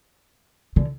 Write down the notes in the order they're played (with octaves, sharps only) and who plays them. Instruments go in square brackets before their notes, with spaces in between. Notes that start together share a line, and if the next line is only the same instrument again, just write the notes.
[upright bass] D3